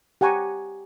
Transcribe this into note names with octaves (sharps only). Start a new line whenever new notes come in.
G4 F#5 G#5 A#5 C#6